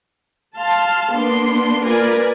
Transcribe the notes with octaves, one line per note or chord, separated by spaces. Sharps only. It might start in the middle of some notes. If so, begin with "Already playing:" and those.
F5 A5 C6
A#3 B3 D4 C6
A#3 F4 A#4 B4 D5 G#5